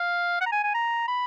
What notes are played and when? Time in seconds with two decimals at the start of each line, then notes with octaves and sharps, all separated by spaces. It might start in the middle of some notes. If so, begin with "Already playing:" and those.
Already playing: F5
0.41 F#5
0.46 A#5
0.52 G#5
0.63 G#5
0.74 A#5
1.08 B5